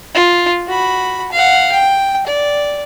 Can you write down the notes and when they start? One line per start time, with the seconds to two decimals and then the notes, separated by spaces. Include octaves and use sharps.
0.14 F4
0.68 F#4 B5
1.32 F5 F#5
1.72 G5
2.27 D5